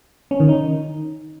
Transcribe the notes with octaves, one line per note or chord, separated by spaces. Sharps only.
C#4
D#3
D#4